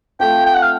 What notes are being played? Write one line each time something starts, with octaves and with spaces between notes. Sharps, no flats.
F3 A3 C4 G5
G5
F#5
F5